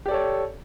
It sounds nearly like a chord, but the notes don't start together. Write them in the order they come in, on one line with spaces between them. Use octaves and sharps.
G4 D5 A4 C#5